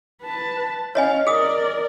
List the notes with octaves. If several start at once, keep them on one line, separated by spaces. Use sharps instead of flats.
B4 A5
C#4 C#5 D#5 F5 G#5
G#4 A#4 D5 D#6